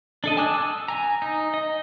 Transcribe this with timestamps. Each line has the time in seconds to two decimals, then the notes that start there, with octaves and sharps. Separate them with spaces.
0.24 D4 A4 D#5
0.37 G#5 A5 D6 D#6 F#6
0.54 E6
0.88 G#5 A#5
1.22 D#4
1.54 D#5